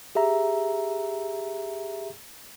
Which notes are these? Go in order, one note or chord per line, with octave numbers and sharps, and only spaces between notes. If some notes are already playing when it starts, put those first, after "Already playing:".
G4 G#4 E5 A#5